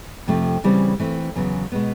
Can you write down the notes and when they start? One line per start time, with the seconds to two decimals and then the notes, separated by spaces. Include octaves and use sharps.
0.27 F2 C3 F3 A3
0.64 C#3 E3 G3 C4
1.00 E3 A3 C4
1.36 E2 C#3 F#3 B3
1.72 B2 G#3 B3